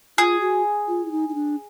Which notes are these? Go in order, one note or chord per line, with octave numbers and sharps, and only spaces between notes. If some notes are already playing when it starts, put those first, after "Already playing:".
F4 G#4
F#4
F4
E4
D#4
D#4
D4